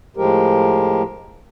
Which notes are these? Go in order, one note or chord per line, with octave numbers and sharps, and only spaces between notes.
A2 F3 G#3 G4 A#4